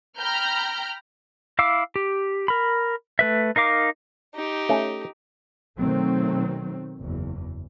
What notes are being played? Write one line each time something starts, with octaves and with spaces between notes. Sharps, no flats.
G5 A#5 B5 F6 G6
E4 F5 D6 E6
G4
A#4 B5
A3 B4 E5
D#4 A#4 F5 D6
D#4 G4
A3 C#4
B2 D#3 F#3 A3 C4
F#1 E2